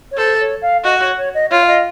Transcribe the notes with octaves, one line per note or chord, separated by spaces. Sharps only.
C#5
A4 C5
C#5
F5
F#4 D#5
C#5
C#5
D#5
F4 C#5
F5
D#5